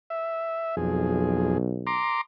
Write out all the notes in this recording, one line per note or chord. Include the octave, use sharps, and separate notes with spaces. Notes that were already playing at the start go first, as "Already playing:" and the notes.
E5
B1 F2 G#4
A#5 C6 D6